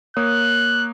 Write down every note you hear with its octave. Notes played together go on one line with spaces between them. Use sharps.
A#3 C#5 D#6 F#6